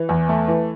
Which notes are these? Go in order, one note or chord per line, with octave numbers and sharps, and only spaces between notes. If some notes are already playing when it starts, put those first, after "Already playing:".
Already playing: E3
E2
A3
E3